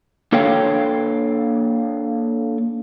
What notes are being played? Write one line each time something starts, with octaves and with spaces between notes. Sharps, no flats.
A#3 D4 A4 C#5 F5 G5